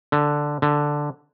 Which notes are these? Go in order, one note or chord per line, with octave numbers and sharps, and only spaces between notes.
D3
D3